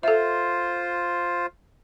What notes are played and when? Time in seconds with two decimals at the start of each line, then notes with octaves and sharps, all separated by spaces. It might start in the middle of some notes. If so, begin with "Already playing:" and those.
0.03 F4 A4 C5 E5